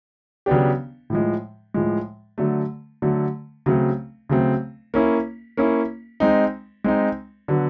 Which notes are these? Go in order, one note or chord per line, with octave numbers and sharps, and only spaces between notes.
C#3 F#3 B3 D4 G4
A2 F3 G#3
A2 F3 G#3
D3 F#3 A3
D3 F#3 A3
C#3 F#3 A3 C4
C#3 F#3 A3 C4
A#3 C#4 E4
A#3 C#4 E4
G#3 C4 D#4
G#3 C4 D#4
D3 F#3 B3